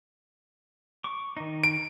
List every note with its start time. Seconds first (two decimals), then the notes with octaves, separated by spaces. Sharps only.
1.04 C#6 D6
1.37 D#3 D#4
1.64 D7